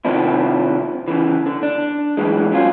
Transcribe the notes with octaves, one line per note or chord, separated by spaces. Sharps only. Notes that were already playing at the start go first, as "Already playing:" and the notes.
C3 D#3 F3 C4 D4 E4
C#3 E3
D3
D4
F#2 A2 E3 G#3
F2 F#3 C#4 F4